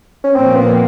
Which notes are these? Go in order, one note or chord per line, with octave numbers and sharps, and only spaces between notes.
C#4
A#2 F3 A#3 C4
B3